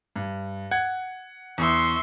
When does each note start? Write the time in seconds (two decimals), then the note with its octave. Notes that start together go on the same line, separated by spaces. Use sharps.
0.16 G2
0.71 F#5 G#6
1.58 E2 E5 C6 C#6